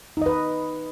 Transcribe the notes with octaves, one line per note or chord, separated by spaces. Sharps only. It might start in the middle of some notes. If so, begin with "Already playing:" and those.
D#4 B4 D#5